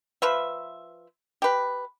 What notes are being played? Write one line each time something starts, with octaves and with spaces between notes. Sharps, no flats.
F3 B4 E5
G4 B4